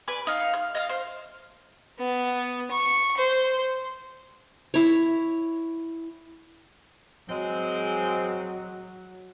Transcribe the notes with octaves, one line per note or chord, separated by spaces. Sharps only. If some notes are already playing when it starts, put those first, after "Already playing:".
B4 D5 G#5
D#4 F5
F6
D#5 F5
C5
B3
C#6
C5
E4 C#5
F#3 G#3 C4